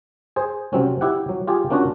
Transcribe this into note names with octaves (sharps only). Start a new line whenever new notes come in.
G#4 C5
C3 F#3 C4 C#4
E4 G4 F#5
F#3
F4 G4 G#4
A#3 C#4 D4 F4 F#4